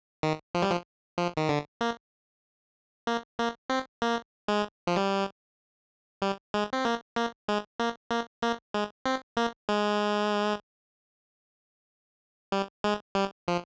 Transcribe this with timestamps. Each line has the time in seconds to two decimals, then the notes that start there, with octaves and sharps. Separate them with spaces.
0.23 D#3
0.55 F3
0.62 G3
0.71 F3
1.18 F3
1.37 D#3
1.49 D3
1.81 A#3
3.07 A#3
3.39 A#3
3.70 C4
4.02 A#3
4.48 G#3
4.87 F3
4.96 G3
6.22 G3
6.54 G#3
6.73 C4
6.85 A#3
7.16 A#3
7.48 G#3
7.80 A#3
8.11 A#3
8.42 A#3
8.74 G#3
9.06 C4
9.37 A#3
9.69 G#3
12.52 G3
12.84 G#3
13.15 G3
13.48 F3